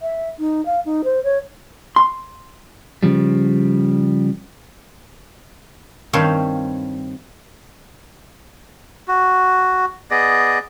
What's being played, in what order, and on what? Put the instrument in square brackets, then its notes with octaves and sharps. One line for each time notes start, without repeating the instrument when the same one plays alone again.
[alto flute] E5
D#4
F5
D#4
C5
C#5
[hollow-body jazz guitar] C6
[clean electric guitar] C#3 F3 G3
[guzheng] G2 D#3 G3 C4 C#5 F5
[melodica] F#4
B3 G#4 D5 D#5